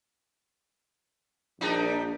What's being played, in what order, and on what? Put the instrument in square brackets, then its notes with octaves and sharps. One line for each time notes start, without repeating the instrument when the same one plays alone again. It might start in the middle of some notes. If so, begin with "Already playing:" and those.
[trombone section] A#1 [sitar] G3 D4 D#4